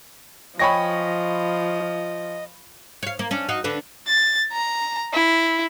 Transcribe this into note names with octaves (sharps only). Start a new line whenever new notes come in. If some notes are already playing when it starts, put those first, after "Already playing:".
F3 C#5 D#5 G5 G#5 B5 C#6 A#6
C#5 F5
A#3
C#4 D4
D#4 F#4 F5
D3 D4 B4
A6
A#5
E4